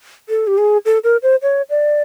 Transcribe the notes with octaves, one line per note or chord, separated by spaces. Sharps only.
A4
G4
G#4
A4
A#4
C5
C#5
D5